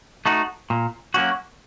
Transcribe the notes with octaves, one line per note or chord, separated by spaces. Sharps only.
A3 D#4 F#4
A#2
F#3 A#3 C#4 F#4